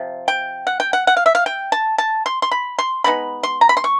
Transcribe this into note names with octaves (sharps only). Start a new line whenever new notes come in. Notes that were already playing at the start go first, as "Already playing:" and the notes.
Already playing: C3 F3
G5
F#5
G5
F#5
F#5
F5
E5
F5
G5
A5
A5
C6
C6
B5
C6
D#3 G#3 B3 D#4 B5
C6
A#5
B5
C6
C#6